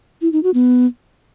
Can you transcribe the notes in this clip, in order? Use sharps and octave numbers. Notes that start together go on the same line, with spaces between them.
E4
D#4
F#4
B3